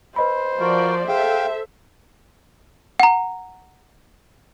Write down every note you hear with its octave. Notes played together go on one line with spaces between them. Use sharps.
B4 C5 D#5 B5
F3 F4 F#4 A#4 D5
G#4 A4 E5 F5 G5
F#5 A#5